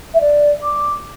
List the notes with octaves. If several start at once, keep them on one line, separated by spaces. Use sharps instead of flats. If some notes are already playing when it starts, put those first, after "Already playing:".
E5
D5
D6